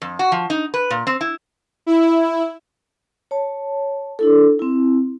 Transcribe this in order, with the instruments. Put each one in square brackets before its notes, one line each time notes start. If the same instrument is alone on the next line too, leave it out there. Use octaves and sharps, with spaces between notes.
[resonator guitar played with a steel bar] F2
F#4
F3
D#4
B4
A#2
C4
E4
[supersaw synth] E4
[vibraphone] C#5 A5
D4 E4 A4
C4 E4